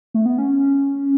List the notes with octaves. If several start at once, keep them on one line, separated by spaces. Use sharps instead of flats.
A3
B3
C#4